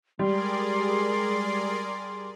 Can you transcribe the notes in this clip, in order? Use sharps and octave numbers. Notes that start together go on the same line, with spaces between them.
G3 G#3 G#4 A#4 D5 C6